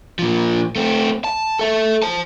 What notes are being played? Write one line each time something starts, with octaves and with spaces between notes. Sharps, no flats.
A#2 F3
A3 C4
A5
A4 E5
C5 A5